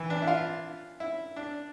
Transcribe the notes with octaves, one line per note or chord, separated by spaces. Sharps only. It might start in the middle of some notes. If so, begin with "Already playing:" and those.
Already playing: E3
D4
E4
F4
E4
D4